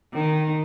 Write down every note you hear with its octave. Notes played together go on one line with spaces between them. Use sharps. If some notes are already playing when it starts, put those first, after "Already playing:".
D#3